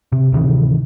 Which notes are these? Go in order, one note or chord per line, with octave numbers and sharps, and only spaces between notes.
C3
D1 C3 D#3 E3